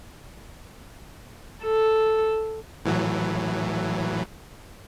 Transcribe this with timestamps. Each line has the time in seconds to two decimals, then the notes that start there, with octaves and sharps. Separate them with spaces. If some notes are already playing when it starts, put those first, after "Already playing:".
1.63 A4
2.85 A2 E3 F#3